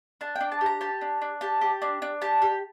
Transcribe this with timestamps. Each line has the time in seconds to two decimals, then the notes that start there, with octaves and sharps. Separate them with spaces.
0.21 D4 A5
0.36 G5
0.41 D4
0.52 A5
0.61 G4
0.66 A#5
0.81 G4 A5
1.01 D4
1.22 D4
1.41 G4 A5
1.61 G4
1.82 D4
2.02 D4
2.22 G4 A5
2.42 G4